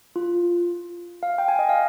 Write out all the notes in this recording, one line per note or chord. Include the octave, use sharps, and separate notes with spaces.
F4
F5
G5
G#5
D#5
F5